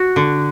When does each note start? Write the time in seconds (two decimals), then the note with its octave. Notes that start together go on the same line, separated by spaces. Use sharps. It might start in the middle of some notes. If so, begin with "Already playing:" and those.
Already playing: F#4
0.16 D3